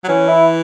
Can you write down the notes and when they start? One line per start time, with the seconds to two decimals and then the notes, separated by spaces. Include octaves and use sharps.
0.04 F#3
0.08 E3 C#4
0.28 E4